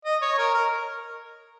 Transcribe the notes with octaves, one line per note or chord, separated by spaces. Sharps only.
D#5
C#5
A#4
A#4